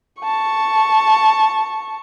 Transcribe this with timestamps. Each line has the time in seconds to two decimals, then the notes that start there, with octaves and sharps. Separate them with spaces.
0.22 A5 C#6